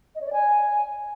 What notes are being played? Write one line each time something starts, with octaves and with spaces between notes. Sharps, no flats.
D#5
C#5
D5
G#5